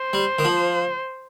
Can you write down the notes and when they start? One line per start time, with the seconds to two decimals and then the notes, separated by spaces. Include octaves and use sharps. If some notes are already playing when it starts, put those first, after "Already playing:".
Already playing: C5
0.13 G3
0.39 D#3
0.45 F3